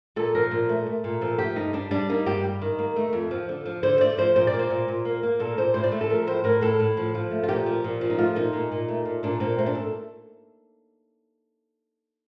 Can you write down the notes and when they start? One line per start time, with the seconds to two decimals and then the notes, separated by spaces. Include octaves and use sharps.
0.16 A#2 A4
0.35 F3 A#4
0.51 A#2
0.69 A3
0.86 A3
1.04 A#2
1.21 F3 A4
1.38 A3 G4
1.56 G2 D#4
1.73 G3 D4
1.91 G3 D4
2.09 A#3 D#4
2.26 G2 G4
2.44 G3
2.62 D#3
2.79 A#3
2.96 A3
3.13 F2
3.31 F3
3.49 D3
3.66 F3
3.83 D3 C5
4.00 A3 D5
4.17 F3 C5
4.36 A#2 C5
4.47 D5
4.53 A#3
4.59 C5
4.70 A#2
4.88 A#2
5.05 A#3
5.23 A#3
5.39 A#2 A4
5.57 A#2 C5
5.74 A2 C5
5.84 D5
5.92 A3
6.01 A4
6.10 F3 A#4
6.27 A2 C5
6.44 A2 A#4
6.61 A2 A4
6.80 A2
6.97 F3
7.15 F3
7.31 A3
7.43 F4
7.48 A#2 G4
7.66 F3
7.84 A#2
8.01 F3
8.10 D#4
8.18 A3 F4
8.36 A#2 D#4
8.53 A#2
8.72 A#2
8.88 A3
9.05 A#2
9.23 A#2 D4
9.40 A#2 C4
9.58 A3 C4
9.66 D4
9.75 A4